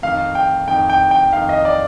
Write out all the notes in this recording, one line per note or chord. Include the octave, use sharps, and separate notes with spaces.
F2 D#3 F5
G5
F2 D#3 G5
G5
G5
F2 D#3 F5
D#5
D5